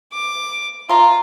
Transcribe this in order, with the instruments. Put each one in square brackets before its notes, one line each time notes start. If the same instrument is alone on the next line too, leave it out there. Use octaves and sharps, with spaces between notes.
[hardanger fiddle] D6
[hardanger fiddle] F4 [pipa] A#5 C6